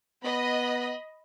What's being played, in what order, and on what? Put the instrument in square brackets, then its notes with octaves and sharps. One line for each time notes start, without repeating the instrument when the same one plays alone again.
[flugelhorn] B3 [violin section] D#5 B5